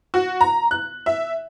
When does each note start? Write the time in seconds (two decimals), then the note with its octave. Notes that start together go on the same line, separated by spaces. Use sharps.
0.14 F#4
0.41 A#5
0.71 F#6
1.06 E5